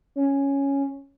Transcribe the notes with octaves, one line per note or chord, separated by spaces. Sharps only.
C#4